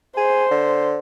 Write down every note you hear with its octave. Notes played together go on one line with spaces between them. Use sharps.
G#4 C5
D3